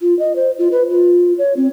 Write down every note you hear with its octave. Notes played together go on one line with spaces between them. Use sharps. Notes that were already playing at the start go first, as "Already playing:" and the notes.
F4
D#5
C5
F4
B4
F4
C#5
C4